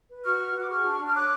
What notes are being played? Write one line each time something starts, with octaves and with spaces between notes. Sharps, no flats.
B4
F#4 C#6 F6
B4
F#4
D6
G#4 C#6 F6
D4
D4
F6
C#5 D6 F#6